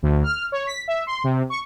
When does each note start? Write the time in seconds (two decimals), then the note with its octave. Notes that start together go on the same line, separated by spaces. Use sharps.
0.03 D2
0.24 F6
0.52 C#5
0.67 B6
0.88 E5
1.07 C6
1.24 C3
1.50 C#6